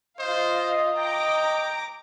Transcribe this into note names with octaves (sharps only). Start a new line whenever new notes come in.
F4 C5 D#5 F5
G5 A#5 D6 A#6